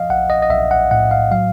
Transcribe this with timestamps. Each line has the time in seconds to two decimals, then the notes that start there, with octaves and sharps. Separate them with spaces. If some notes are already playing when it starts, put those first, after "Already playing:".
Already playing: F3 D#5 F5
0.10 B1 F#5
0.30 D#5
0.42 D#5
0.50 B1 E5
0.71 F#5
0.91 A2 F#5
1.11 F5
1.31 F#3 F5